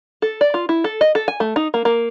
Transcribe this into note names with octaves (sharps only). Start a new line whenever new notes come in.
A4
D5
F4
E4
A4
D#5
A4
G#5
A3
D#4
A#3
A#3